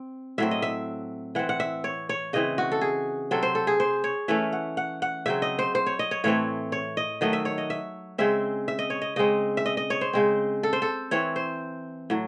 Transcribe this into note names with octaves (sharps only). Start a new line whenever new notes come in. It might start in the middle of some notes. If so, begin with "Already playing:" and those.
Already playing: C4
A2 F#3 C4 E5
D#5
E5
E3 C4 F#5
F#5
E5
C#5
C#5
C#3 E3 C4 D#5
F#4
A4
G#4
C3 F#3 C4 A4
C5
A4
G#4
C5
C#5
E3 A3 C#4 E5
F#5
F#5
F#5
C#3 F#3 C4 E5
D#5
C5
C5
C#5
D#5
C#5
A2 E3 A3 C4 C#5
C#5
D#5
D#3 F#3 A3 D#5
E5
C#5
D#5
E5
C#3 G#3 C4 E5
E5
D#5
C#5
D#5
C#3 G#3 C4 D#5
E5
D#5
D#5
C#5
C5
C#3 G#3 C4
A4
C5
A4
E3 C4 C#5
C5
A2 F#3